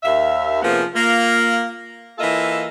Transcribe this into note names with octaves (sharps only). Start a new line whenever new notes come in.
D#2 E5 F5
C3 F3 A#3 B3 C#4 G#4
A#3 F4
E3 A#3 F4 A4 D#5 E5